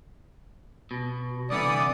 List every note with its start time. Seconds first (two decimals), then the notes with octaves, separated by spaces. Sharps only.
0.91 B2
1.50 C2 D3 E3 B3 D5 D#6